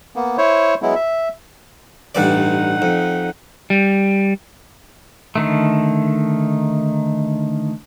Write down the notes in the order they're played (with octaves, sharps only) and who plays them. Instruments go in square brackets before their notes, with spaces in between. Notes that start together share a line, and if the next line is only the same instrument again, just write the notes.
[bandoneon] A#3 B3
E4 C5 C#5
F#3 G#3 B3 E4
E5
[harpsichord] A1 G2 D5 [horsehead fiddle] D#4 F#5
[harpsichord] F2
[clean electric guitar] G3
[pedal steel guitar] D3 D#3 A3